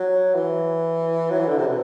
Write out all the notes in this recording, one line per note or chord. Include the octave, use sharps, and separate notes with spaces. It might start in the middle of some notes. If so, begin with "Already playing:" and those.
Already playing: F#3
E3
F#3
E3
D3
C3
B2